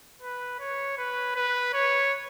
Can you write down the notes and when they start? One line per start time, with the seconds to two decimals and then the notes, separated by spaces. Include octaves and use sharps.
0.22 B4
0.60 C#5
0.98 B4
1.35 B4
1.74 C#5